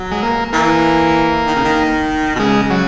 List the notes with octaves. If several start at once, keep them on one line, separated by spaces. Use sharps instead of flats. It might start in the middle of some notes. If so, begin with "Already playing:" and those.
Already playing: F#3
G#3
A#3
E3 A#3
D#3
C#3
D#3
B2
C#3 G#3
F#3